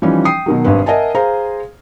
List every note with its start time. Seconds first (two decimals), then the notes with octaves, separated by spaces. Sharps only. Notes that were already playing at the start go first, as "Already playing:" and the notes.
0.02 E3 F3 G3 C#4 D#4
0.25 G5 D#6 C7
0.46 B2 D#3 F#3
0.64 G#1 G2 B4
0.86 A#4 D#5 E5 F#5 G#5 A5
1.15 G#4 C5 F5 A#5